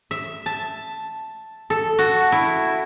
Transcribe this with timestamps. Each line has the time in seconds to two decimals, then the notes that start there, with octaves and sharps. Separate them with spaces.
0.11 E5
0.46 A5
1.70 A4
1.99 F#4
2.32 E4